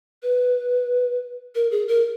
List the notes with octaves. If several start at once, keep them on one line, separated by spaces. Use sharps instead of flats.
B4
A#4
G#4
A#4